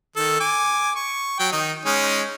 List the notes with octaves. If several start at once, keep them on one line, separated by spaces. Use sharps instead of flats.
D#3 A4
G#5 D6
C#6
F#3 G5
D#3 D#4
G#3 C#4 D#4